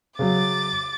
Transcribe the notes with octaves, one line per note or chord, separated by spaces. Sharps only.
C#3 F#3 C#4 D6 A6